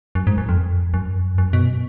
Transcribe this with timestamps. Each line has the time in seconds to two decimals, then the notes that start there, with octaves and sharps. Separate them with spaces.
0.15 F#2
0.27 G#2
0.38 F#2
0.49 F2
0.94 F#2
1.38 F#2
1.53 B2